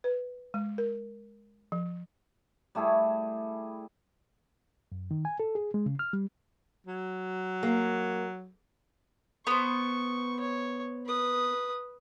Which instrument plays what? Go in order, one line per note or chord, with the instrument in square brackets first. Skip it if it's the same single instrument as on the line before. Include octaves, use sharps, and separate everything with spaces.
[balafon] B4
G#3
A#4
F3
[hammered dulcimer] G3 A3 E4 G#4
[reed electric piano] F#2
D#3
G#5
A4
G#4
G#3
C#3
F6
G3
[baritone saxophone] F#3
[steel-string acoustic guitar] A#3
[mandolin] B3 C5 [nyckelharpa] C#6
[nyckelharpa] C#5
B4 D#6